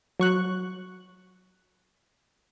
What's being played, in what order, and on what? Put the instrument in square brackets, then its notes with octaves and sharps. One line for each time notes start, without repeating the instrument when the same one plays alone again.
[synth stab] F#3 C#6 F#6